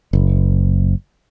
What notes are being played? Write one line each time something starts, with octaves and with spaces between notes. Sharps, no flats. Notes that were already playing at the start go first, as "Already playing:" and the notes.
F#1